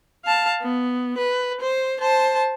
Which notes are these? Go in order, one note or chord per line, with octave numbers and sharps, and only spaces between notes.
F5 A5
B3
B4
C5
C5 A5